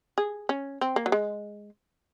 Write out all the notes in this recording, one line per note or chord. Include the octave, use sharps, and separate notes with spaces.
G#4
C#4
C4
A#3
F#3
G#3